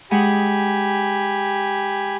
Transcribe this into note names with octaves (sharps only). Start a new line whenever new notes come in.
G#3 G4 G#4 F#5 G#5 B5